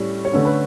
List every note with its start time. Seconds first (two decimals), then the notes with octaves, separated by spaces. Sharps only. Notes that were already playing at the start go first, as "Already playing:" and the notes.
Already playing: A2 G3 C#4
0.25 C#5
0.33 D3 A3 C#4 B4
0.45 B4